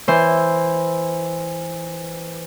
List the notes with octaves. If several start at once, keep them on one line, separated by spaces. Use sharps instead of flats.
E3 C5